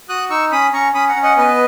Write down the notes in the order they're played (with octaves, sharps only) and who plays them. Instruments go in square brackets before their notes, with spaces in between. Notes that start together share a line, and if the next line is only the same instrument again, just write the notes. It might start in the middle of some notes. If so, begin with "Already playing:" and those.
[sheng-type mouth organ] F#4 D#6 F#6
D#4 C#6 E6
C#4 B5 D#6
C#4 A#5 C#6
C#4 B5 D#6
F#5 A#5
C#4
D#5 F#5
B3 B4 D#5